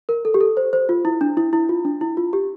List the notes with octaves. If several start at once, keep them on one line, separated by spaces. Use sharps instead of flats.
A#4
A4
G4
A4
C5
C5
F4
E4
D4
E4
E4
F4
D4
E4
F4
G4